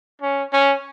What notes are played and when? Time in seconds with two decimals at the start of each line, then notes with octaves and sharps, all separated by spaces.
0.21 C#4
0.52 C#4